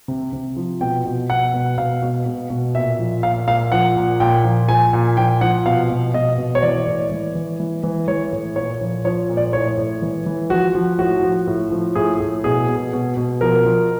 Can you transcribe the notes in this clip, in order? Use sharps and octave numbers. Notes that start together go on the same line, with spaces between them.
C3
C3
F3
B2 G5
B2
B2 F#5
B2
B2 F5
B2
B2
B2
A#2 E5
F3
A#2 F5
A#2 F5
F3 F#5
A#2
A#2 G5
F3
F3 G#5
A#2
F3 G5
F3 F#5
B2 F5
B2
B2 D#5
B2
C#5
E3 D5
A2
E3
E3
E3
E3
E3 C#5
A2
A#2 C#5
F3
F3 C#5
A#2
D5
A2 C#5
A2
E3
E3
F3 F#4
F3
A2 F#4
F3
A2
F3
A2 G#4
A2
B2 G#4
B2
B2
B2
F3 A#4
F3